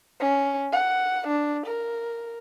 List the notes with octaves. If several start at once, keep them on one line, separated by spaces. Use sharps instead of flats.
C#4
F#5
D4
A#4